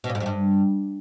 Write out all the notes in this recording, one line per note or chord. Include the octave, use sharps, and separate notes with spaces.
B2
A#2
G#2
F2
G2